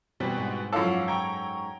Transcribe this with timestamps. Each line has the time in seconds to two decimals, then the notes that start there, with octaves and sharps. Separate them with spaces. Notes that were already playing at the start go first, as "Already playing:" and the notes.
0.20 B2 E3 G3 C4
0.37 G#2
0.73 F#2 F3 E4 A4 C#5 F5 F#5 D6
1.08 G5 A#5 C#6 G#6